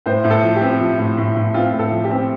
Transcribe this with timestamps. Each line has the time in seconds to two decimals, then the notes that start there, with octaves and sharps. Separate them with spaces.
0.06 A2 C5
0.24 A2
0.30 A4
0.43 F3
0.55 G4
0.61 C4
0.80 F3
0.99 A2
1.17 A2
1.36 A2
1.54 C4 F4
1.73 A2
1.79 A4
1.92 F3
2.04 G4
2.10 C4